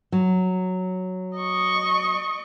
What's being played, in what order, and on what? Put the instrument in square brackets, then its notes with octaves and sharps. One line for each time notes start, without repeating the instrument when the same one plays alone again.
[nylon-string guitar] F#3
[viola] D#5 C#6